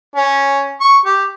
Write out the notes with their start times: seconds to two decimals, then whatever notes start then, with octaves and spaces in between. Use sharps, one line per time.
0.16 C#4
0.81 C#6
1.06 G4